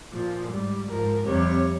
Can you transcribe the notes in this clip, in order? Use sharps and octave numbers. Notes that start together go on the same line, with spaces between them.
A#2 F3
G#2 G3
G#2 F3 A#4
F2 C3 G3 C#5